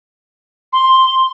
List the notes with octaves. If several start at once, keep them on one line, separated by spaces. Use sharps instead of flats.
C6